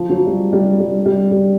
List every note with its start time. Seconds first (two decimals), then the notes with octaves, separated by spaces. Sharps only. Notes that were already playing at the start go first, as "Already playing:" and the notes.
Already playing: F3
0.09 F#3
0.27 G3
0.53 G3
0.80 G3
1.06 G3
1.31 G3